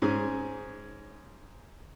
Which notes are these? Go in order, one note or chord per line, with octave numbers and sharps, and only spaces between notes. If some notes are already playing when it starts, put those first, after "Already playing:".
G#2 C#4 G#4